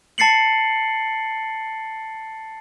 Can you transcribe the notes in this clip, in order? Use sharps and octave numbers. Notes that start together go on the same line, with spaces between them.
A5 A6 C7 C#7 F#7